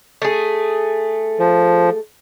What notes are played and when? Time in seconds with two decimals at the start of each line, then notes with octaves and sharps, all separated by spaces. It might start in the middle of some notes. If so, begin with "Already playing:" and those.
0.22 A3 G#4
1.39 F3